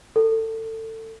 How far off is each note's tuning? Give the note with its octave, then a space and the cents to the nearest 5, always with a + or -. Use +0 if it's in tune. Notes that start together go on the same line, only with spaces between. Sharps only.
A4 +25